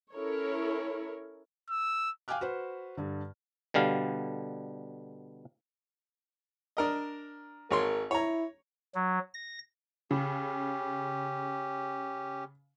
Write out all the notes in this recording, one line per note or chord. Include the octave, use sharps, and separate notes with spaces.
C#4 E4 A4 A#4 C#5
E6
F5 G5 G#5 D6 F6 F#6
F#4 B4 C5
G2 D3
B2 D3 G3 F5
D4 A#4 D#5
G#1 A#4 C#5 C6
E4 C#5 A#5
F#3
A#6
C#3 C#4 G4